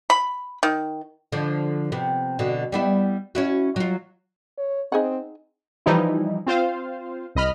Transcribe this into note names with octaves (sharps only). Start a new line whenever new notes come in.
B5
D#3
D3 F3
C3 B3
B2 D3
G3 B3 E4
C#4 E4 F#4
F#3 F4
C#5
C4 D#4 G#4 F#5
E3 F3 G3 D#4 E4
C4 F4 C5 F5
C2 D#5 B5 F6